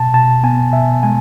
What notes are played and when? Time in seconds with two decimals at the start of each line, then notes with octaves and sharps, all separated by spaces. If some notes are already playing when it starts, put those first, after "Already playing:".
Already playing: B2 A5
0.14 B2 A5
0.43 B3 G#5
0.73 B2 E5
1.03 G#3 G#5